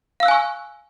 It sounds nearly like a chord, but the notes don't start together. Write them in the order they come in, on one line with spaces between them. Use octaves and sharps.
F5 E6 F#6 G#5 C#6